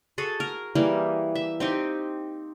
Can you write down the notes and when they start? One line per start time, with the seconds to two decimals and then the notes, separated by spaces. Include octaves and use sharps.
0.18 F#4 G#4 A4
0.40 A#4
0.75 E3 G3 A#3 G#4
1.35 E5
1.60 C4 D#4 G4